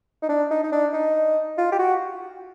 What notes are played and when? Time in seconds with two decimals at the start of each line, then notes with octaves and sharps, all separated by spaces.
0.22 D#4
0.29 D4
0.51 D#4
0.64 D#4
0.72 D4
0.93 D#4
1.58 F4
1.72 G4
1.79 F#4